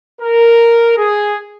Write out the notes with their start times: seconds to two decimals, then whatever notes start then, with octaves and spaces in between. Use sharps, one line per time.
0.20 A#4
0.96 G#4